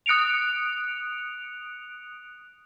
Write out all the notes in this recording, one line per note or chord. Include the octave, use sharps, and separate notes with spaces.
D#6 F#6 C#7 D7 F7